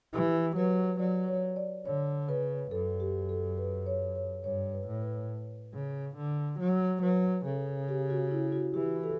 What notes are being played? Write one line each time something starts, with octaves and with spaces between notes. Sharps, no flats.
E3 G4
F#3 B4
F#3 D5
C#5
D5
D3 C#5
C#3 B4
F#2 A4
G4
A4
B4
C#5
C#5
G2 C#5
B4
A2
B4
C#3
D3
F#3
F#3 B4
C#3 A4
G4
F#4
E4
F#4
E3 G4
A4